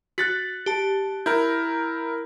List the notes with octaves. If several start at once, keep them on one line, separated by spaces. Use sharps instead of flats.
F#4 F#6 A6 B6
G4 A5
E4 A#4 G6